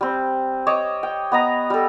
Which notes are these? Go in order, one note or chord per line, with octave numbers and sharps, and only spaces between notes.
G3 C4
C#5 D#5 A5 D6
G5
B3 D#5 A#5
G3 A4